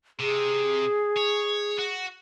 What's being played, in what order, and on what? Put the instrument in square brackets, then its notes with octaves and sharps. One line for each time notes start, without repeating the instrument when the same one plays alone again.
[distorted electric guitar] C3 [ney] G#4
[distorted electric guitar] C#5
F#4